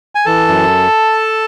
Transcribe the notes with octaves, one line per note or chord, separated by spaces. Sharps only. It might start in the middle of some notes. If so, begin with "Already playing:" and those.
G#5
E3 A4 A5
F#2